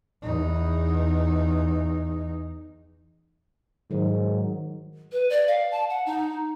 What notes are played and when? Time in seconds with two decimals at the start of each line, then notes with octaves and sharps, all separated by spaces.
0.22 E2 D#4
3.91 G#2 D#3 F#3
5.12 B4
5.30 D5
5.48 F5
5.71 A5
5.90 F#5
6.06 D#4